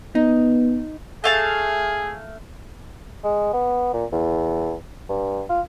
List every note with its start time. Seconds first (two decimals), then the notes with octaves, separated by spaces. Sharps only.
0.15 B3 D#4
1.24 A3 G#4 F5 A5
3.24 G#3
3.53 B3
3.93 A#2
4.12 E2
5.09 G2
5.49 F4